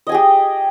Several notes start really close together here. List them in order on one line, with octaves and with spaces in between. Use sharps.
D#5 G#5 G#4 G4